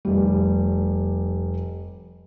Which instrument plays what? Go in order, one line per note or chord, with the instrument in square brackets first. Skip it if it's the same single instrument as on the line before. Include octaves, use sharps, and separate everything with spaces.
[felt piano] F1 G3